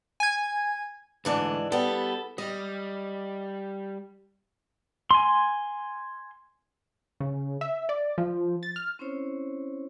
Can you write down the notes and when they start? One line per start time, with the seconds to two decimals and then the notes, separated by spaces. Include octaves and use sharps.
0.20 G#5 G#6
1.25 D2 G#2 E3 D4
1.72 G3 B3 A4
2.38 G3 D#5
5.11 G#5 C6
7.20 C#3
7.61 E5
7.89 D5
8.18 F3
8.63 A6
8.76 F6
8.99 C4 C#4 E4 C5 C#5